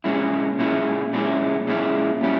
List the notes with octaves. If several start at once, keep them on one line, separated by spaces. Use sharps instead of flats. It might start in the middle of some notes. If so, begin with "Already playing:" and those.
A#2 G#3 C#4 E4
A#2 G#3 C#4 E4
A#2 G#3 C#4 E4
A#2 G#3 C#4 E4
A#2 G3 C#4 E4